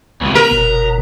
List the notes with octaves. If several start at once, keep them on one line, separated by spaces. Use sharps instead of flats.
C#2 C3 B3
A#4 A#5
F#1 B2